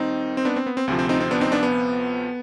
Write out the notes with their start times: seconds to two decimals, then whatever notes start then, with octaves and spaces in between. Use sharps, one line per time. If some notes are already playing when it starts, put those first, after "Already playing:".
Already playing: D#2 D#3 G3 C4 D#4
0.37 C4
0.45 B3 D4
0.56 C4
0.66 B3
0.77 C4
0.87 D2 C3 F3 C4
0.99 C4
1.09 C4 D#4
1.20 C4
1.31 B3 D4
1.41 C4 D#4
1.52 B3 D4
1.63 B3